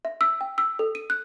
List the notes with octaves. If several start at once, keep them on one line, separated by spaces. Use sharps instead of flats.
E5
E6
G5
E6
A4
D#7
F#6